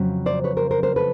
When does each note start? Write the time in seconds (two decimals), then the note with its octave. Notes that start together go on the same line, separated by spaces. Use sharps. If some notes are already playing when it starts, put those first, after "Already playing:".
Already playing: F2 C#3 F#3
0.26 C5 D5
0.44 B4 C#5
0.57 A#4 C5
0.71 A#4 C5
0.83 A#4 C5
0.96 A4 B4